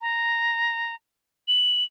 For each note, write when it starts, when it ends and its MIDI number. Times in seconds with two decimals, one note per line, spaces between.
0.01 0.95 82
1.48 1.84 102